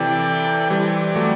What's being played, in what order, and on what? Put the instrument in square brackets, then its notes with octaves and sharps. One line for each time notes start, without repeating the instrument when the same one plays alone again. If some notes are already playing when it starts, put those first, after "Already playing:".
Already playing: [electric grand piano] C3 E3 [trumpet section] E4 A4 D5 G5
[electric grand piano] E3 G3 [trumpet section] C4 G4 D5
[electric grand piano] F#3 A3